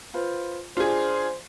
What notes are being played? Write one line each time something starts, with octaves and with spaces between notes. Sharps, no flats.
F4 B4 C5
D4 F4 G#4 C5